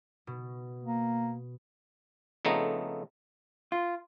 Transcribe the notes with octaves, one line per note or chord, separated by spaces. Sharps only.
B2
A#3
F2 C#3 A3 B3 D#4 A#5
F4